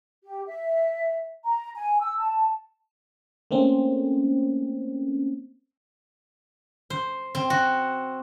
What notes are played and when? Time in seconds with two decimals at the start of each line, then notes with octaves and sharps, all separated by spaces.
0.24 G4
0.48 E5
1.44 A#5
1.75 G#5
2.02 E6
2.18 A5
3.51 A3 A#3 C4 C#4
6.90 C5
7.35 C4
7.50 F#4